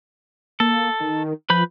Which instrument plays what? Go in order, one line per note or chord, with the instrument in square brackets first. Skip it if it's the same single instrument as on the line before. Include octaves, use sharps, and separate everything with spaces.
[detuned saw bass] A#3 [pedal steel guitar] A4
[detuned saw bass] D#3
[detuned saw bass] F3 [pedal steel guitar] B4 B5 G6